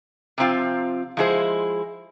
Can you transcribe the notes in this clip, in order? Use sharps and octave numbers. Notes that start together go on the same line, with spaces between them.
C3 F3 C4 F4
F3 G#3 E4 G#4 C5